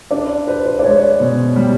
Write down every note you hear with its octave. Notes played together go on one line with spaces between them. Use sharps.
D4 D5
B4 C5
C5
D5
G#3 C#5
B2
G3